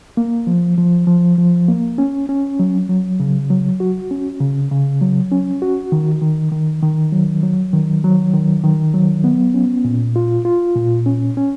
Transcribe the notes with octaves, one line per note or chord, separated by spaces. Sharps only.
A#3
F3
F3
F3
F3
A#3
C#4
C#4
F#3
F#3
C#3
F#3
F#4
C#4
C#3
C#3
F#3
C#4
F#4
D#3
D#3
D#3
D#3
F#3
F#3
D#3
F#3
D#3
D#3
F#3
B3
C#4
A#2
F4
F4
A#2
C#4
C#4